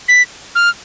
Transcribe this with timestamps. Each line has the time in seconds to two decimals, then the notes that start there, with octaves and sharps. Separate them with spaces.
0.08 B6
0.55 F6